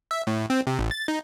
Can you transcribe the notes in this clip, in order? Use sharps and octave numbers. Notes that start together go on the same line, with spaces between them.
E5
A2
C4
C3
A1
A6
D#4